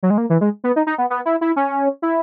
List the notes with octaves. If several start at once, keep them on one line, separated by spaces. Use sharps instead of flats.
F#3
G#3
A#3
E3
G#3
B3
D#4
D#4
B3
B3
E4
E4
C#4
E4